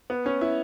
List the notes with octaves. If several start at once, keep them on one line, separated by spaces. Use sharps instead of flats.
B3
C#4
E4